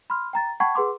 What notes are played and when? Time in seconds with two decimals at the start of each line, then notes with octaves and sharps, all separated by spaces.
0.10 B5 C6 F6
0.33 G5 A#5 A6
0.60 F#5 G5 A5 B5 C#6 G#6
0.75 G#4 B4 F#5 C6 D6